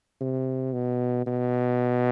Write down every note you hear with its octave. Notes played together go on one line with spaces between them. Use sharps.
C3
B2
B2